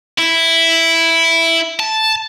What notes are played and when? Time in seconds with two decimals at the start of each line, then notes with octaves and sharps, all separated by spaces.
0.19 E4
1.80 A5